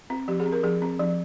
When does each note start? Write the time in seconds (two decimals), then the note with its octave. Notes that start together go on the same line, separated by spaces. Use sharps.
0.10 C4
0.28 F3 G4
0.40 G#4
0.46 C4
0.52 A#4
0.63 F3 G#4
0.82 C4
1.00 F3